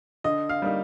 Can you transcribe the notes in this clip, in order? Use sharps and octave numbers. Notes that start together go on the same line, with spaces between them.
D3 D#5
F5
G3 A#3 D#4